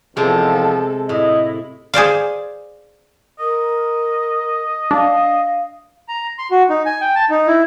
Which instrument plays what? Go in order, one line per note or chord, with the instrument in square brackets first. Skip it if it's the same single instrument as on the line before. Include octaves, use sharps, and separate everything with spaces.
[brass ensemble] E2 D#3 F3 [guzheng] C3 G#3 [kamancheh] A4
[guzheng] A2 [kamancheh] E4 [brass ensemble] D#5
[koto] G#4 C5 D5 F5
[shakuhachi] A#4 [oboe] D#5
[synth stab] D4 [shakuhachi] F5
[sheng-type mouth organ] A#5
C6
F#4
D#4
G#5
G5
A5
D#4
E4